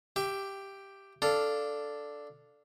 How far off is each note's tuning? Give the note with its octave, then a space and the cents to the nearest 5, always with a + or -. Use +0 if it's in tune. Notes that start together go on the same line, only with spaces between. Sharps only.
G4 +0 E5 +30
D4 +0 A4 +0 F5 +0